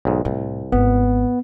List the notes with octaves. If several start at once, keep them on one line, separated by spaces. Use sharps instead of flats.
B1 G#2
C2 A2
G#1 B3